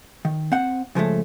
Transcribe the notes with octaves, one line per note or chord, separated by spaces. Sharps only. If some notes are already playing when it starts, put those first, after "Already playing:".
D#3
C4 F#5
C#3 F3 G#3 A3